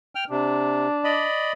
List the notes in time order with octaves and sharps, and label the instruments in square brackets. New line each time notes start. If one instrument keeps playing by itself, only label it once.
[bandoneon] G5 F6
[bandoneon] C3 [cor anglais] D4
[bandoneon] D5 D#5 B5